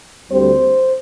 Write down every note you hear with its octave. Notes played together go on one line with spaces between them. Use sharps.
D2 D3 G3 C4 C5